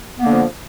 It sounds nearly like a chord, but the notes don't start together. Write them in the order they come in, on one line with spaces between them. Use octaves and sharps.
B3 A#3 D3 F3